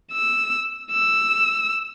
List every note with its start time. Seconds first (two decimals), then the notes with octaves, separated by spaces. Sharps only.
0.12 E6
0.92 E6